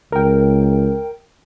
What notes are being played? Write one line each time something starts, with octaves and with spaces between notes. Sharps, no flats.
C#2 A#4 G5